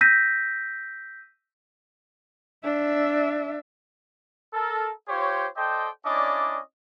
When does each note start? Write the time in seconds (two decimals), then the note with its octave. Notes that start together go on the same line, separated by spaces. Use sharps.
0.01 E6 G6 A#6 B6 D#7
2.64 D4 E5
4.53 A4 A#4
5.07 F4 G4 C5 C#5
5.56 A4 C5 D5 D#5 G5
6.05 C#4 D4 E4 D5 D#5 D6